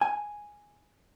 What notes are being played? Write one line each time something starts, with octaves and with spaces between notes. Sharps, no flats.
G#5